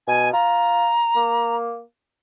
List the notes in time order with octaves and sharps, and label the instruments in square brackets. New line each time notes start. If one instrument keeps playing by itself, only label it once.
[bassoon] B2 [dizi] G#5
[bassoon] F4 [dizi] A#5
[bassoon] A#3